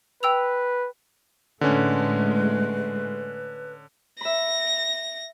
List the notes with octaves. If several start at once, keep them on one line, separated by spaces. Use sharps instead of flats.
B4 G5 E6 F7
A2 D3 G#3 A3 C#4 B4
E5 B5 A#6